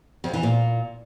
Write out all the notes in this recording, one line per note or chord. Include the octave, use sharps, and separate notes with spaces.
F2
E3
A#2